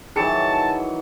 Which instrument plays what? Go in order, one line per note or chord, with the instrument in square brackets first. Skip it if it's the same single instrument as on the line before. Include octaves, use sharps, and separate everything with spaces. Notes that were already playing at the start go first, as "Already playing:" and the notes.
[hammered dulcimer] D#3 E3 F#3 [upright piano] G#4 C#7 [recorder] A5